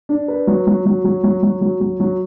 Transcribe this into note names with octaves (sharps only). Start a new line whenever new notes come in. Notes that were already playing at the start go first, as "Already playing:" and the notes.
D4
B4
F#3
F#3
F#3
F#3
F#3
F#3
F#3
F#3
F#3